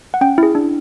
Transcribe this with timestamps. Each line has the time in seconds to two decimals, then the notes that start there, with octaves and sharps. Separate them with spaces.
0.14 F#5
0.21 C#4 G5
0.38 E4 G#4
0.55 D4